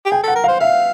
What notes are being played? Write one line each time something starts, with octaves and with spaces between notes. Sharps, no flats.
G4
G#4 G5
A4
F#5
A#4
F5
C5
E5 F5